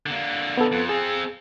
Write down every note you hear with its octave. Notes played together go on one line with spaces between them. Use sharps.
D3 A#3
B3 A4
F2
C4 G#4 A4